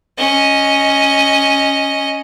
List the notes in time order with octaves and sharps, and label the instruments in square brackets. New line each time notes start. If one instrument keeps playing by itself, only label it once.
[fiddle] C#4 D#5